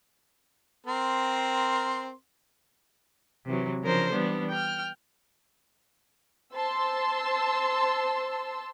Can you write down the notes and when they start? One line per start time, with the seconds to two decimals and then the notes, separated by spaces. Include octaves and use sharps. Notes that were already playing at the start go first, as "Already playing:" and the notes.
0.86 C4 A#4 C6
3.46 C3 E3 F#3
3.82 C#3 F3 D4 A#4 C5
4.11 E3 G3 B3 D4
4.50 G5 F6
6.55 C5 A5 C6 E6